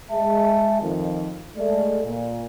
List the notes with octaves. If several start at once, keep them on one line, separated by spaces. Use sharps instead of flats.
G#3 E5 A5
F2 D#3
G#3 A3 D5
A#2